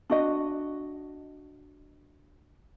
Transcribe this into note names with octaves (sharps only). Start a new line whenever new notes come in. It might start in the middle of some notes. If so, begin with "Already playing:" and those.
D4 F#4 D#5